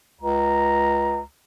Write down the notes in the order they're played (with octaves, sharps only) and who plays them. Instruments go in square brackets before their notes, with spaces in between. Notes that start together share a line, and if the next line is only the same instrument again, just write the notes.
[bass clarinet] C#2 [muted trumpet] A#5